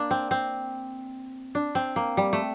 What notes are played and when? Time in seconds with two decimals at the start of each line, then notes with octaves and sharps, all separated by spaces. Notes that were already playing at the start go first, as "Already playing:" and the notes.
Already playing: A#3 D4
0.11 C4
0.31 C4
1.55 D4
1.75 C4
1.96 A#3
2.17 G3
2.33 A3